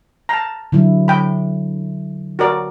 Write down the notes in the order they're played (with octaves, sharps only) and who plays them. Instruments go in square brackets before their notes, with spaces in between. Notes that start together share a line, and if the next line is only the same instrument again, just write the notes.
[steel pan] A5 A#5
[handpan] D3 F#3 E4
[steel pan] G5 B5
F#4 A#4 D5